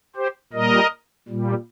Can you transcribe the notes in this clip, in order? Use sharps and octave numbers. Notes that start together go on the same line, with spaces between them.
G4 C5
A#2 G3 A#4 D#5
A#2 G3